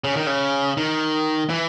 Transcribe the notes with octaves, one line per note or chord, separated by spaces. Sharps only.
C#3
D#3
C#3
D#3
E3